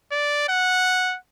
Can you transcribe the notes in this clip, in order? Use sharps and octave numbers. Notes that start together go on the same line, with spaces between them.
D5
F#5